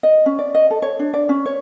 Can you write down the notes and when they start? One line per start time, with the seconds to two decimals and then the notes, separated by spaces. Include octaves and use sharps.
0.03 D#5
0.26 C#4
0.39 D5
0.55 D#5
0.71 A4
0.82 C#5
0.99 D4
1.14 D5
1.29 C#4
1.46 C#5